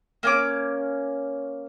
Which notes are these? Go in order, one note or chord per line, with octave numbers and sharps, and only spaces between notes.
A#3 C#4 D6